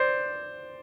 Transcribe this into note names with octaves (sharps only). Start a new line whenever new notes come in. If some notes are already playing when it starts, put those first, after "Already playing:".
Already playing: C5 D5